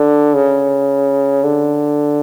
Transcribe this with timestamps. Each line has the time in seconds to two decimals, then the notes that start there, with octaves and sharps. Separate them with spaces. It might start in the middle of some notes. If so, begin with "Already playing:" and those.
Already playing: D3
0.34 C#3
1.44 D3